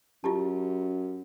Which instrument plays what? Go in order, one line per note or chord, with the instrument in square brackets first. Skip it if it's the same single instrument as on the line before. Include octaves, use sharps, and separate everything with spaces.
[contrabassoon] F#2 [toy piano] F4 G4 A5